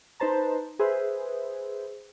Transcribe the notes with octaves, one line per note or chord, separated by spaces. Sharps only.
D#4 B4 C5 A5 A#5
G#4 B4 C5 E5